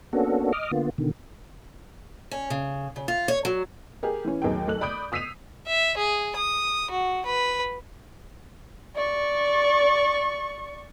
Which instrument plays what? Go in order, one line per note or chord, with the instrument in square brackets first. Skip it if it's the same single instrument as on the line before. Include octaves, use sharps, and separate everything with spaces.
[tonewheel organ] A#3 B3 C#4 D4 F#4 A4
D#5 D6 D#6 F6
D3 A#3 B3 F4
B2 D3 D#3
[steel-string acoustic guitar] C#4
C#3
C#3
F4
C#5
F#3
[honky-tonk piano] G4 G#4 A#4
E3 C#4
D#2 F#3 G#4 G5
B1 A4 F#6 F#7
D5 B5 D6 D#6 G6 D7
D#6 E6 B6 C7 D#7 F7
[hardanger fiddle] E5
G#4
D#6
F#4
B4
[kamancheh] D5 C#6